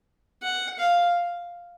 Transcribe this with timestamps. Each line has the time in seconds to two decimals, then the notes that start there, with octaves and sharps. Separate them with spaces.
0.43 F#5
0.79 F5